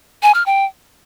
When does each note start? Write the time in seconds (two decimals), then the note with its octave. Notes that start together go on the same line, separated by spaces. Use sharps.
0.23 G#5
0.34 F6
0.46 G5